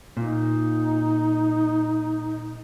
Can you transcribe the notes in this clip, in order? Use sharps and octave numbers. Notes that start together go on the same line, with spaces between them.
A#2 D#4